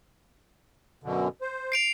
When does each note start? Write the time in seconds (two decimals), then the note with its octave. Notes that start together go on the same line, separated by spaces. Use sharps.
1.03 F#2 B2 D3
1.41 C5
1.72 C7 D7 F7